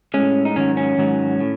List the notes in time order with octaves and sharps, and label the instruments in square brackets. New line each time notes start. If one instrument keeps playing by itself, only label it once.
[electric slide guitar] A2 G#3 C#4
D#4
G#2 D#3 F#3 C#4
C#4
G#2 D#3 F#3
A2